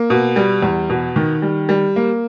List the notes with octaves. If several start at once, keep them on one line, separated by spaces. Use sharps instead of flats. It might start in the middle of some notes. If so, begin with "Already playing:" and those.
Already playing: A#3
B2
G3
E2
B2
D#3
G3
G3
A#3